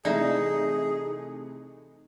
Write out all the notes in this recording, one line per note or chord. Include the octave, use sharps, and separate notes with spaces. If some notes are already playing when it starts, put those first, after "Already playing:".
C3 E3 A3 D#4 G#4 D5 E5 A#5